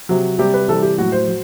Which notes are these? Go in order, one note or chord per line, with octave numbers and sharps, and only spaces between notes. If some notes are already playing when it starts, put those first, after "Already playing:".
C3 F#3
C3 G3 G4
B4
C3 E3 G3 A4
G4
A2 F#3 F#4
C5
F#3